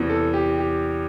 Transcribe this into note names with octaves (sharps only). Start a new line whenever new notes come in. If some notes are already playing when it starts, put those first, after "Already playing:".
Already playing: E2 C3 E3
A4
G4
G4